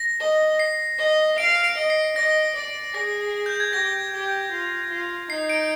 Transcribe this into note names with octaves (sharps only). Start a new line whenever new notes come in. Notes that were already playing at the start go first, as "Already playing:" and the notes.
Already playing: A#6
D#5
C7
D#5
F5 D7
D7
D#5
C7
D#5 A#6
D5
G#4 A#6
G6
G#6
G4 A#6
G4
F4
F4
D#4 C7
D7